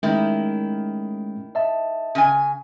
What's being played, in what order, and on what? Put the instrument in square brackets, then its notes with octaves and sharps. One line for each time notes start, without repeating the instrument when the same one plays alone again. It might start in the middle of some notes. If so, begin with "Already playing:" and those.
[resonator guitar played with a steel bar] D#3 E4 [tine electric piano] G#3 A3 C#4
[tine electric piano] D#5 E5 A5
[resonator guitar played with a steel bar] C#3 G#5